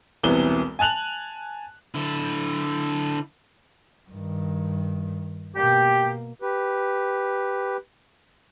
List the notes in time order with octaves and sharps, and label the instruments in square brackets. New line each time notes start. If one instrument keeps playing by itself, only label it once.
[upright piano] E1 C2 C3 E3 B3 G7
G#5 A5 F#6 F7 F#7
[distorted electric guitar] D3 E4
[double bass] G2 D#3
[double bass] B2 A#3 [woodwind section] G4
[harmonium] G4 B4